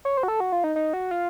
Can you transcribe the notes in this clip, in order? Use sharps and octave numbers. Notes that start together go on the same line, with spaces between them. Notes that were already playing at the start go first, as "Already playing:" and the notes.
C#5
C5
F#4
A4
F#4
F4
D#4
D#4
F#4
F4